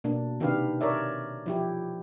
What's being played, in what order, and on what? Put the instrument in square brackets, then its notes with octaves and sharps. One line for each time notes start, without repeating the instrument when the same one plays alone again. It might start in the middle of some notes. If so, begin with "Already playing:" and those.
[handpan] B2 A#3 D4
C3 D#3 D4 G4 B4 F5
A#4 C#5 D5 E5
F3 E4 G4